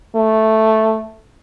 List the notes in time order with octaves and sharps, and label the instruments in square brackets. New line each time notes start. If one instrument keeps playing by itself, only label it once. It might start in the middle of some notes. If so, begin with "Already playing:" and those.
[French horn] A3